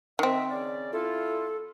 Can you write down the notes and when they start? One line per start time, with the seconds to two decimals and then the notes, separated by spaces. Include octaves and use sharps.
0.19 D#3 C4 D#4 D#5 E5
0.50 C#3 C#4 D5
0.93 E4 F4 A4